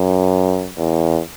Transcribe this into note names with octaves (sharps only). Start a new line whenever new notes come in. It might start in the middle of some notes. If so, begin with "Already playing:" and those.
Already playing: F#2
E2